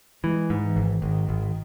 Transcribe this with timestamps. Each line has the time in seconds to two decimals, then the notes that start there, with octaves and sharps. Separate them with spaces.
0.24 E3 G#3
0.50 G#2
0.63 E3
0.76 G#1
1.02 G#1 D#3
1.29 G#1